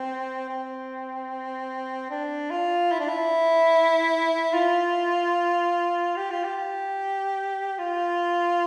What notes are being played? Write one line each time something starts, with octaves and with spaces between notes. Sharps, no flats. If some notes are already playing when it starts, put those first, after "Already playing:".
Already playing: C4
C4
D4
F4
E4
D4
E4
F4
G4
F4
G4
F4